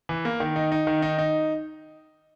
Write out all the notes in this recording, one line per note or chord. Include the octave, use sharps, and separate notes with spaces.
E3
A#3
D#3
D#4
D#4
D#3
D#4
D#4